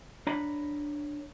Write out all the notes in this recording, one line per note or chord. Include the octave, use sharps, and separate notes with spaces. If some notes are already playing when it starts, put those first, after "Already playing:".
D4 C#5 A#5 B5